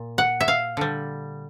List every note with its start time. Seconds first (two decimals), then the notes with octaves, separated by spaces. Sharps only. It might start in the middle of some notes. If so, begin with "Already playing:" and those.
Already playing: A#2
0.18 F#5
0.41 E5
0.48 F5
0.77 D3 G3